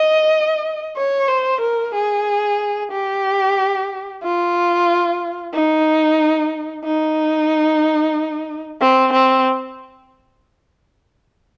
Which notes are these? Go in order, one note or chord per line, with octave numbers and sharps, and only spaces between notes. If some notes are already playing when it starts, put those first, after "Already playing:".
Already playing: D#5
C#5
C5
A#4
G#4
G4
F4
D#4
D#4
C4
C4